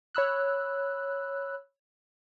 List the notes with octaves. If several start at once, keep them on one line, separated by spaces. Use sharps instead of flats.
C#5 B5 E6 F#6